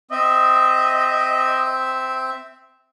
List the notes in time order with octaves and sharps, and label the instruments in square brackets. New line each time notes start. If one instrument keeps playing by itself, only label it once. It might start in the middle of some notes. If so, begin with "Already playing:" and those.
[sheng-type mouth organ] C4 E5 [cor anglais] D#5